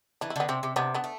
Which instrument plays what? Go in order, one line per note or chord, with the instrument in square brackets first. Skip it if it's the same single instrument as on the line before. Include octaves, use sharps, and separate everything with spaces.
[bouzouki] E3 [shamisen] D4
[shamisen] E4
[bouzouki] D3 [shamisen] B3 D4
[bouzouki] C3 [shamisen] C4
[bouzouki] C3
[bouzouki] C3 [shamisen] B3 D4
[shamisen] B3 D4
[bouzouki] A3